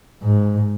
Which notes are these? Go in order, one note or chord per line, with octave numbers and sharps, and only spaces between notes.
G#2